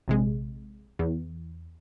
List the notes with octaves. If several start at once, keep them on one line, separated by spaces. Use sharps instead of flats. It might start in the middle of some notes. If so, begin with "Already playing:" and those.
A#1 C3 G#3
E2